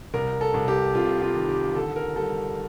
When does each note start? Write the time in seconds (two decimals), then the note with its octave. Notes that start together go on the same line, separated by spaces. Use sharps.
0.14 C2 A#4
0.41 A4
0.54 C2
0.68 G4
0.95 C3 F4
1.22 F4
1.36 D#3
1.49 G4
1.75 D3 A4
1.96 A#4
2.16 G3 A4